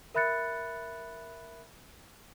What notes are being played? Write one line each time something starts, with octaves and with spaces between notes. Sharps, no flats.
A#4 E5 B5 F#6 A6 C#7